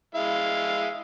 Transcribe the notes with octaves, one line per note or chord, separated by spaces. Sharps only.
G#3 E4 F5